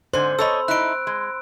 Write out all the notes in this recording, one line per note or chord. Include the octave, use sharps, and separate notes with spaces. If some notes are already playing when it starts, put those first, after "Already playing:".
G#2 D3 C5 G#5 C6
A4 C#5 D#5 B5 E6
D#4 E4 F#6 D7
G#3